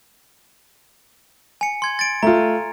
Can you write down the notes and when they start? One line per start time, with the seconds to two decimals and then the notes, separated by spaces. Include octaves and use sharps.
1.61 G#5 C#7
1.82 C6 G#6
1.99 A6 D7
2.23 A3 F4 A#5